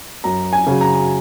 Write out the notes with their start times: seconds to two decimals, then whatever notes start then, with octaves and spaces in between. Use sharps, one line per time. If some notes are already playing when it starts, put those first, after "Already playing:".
0.24 F#2 A#5
0.53 G#5
0.67 C#3 F#3
0.81 A#5